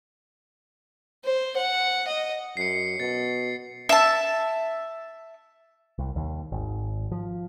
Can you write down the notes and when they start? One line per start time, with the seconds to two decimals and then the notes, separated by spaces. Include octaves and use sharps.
1.24 C5
1.56 F#5
2.08 D#5
2.57 F#2 C7 C#7
3.00 B2 A6
3.89 E5 A5
5.98 C2
6.16 D#2
6.52 G#1
7.12 F3